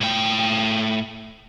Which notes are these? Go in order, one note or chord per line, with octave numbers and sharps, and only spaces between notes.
A2 G5